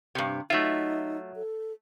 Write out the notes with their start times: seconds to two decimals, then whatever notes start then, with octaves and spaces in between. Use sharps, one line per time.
0.15 G2 C3
0.50 F#3 A3 D#4 F4 E5
1.36 A4